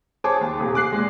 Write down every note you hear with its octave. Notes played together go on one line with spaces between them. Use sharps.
G#4 C5 C#5 A5 D6
D#2
D#1 C3 G#4
D6 F#6 C7
A#2 G#3